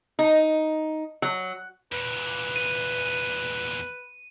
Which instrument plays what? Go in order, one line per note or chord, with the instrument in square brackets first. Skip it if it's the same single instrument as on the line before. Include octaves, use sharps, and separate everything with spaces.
[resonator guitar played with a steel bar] D#4
F#3
[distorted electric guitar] E2 A#2 [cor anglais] B4
[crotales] D#7